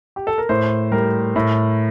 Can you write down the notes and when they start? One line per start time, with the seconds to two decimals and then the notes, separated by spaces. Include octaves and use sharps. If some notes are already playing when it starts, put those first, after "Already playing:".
0.16 G4
0.27 A4
0.38 A#4
0.49 A2 C5
0.92 G3 A#4
1.36 A2